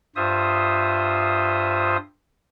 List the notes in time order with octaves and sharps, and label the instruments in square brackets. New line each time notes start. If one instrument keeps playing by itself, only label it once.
[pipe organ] G2 F4 C5 E5 D#6